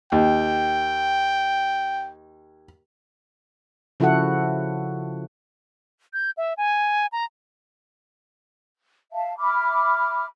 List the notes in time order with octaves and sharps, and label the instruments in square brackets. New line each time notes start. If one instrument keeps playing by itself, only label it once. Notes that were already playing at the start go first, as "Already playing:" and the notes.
[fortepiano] D#2 [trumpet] G5
[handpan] C#3 F3 E4 F#4 A4 F#5
[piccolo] G6
E5
G#5
A#5
[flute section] E5 F5 A5
E5 B5 D6 F6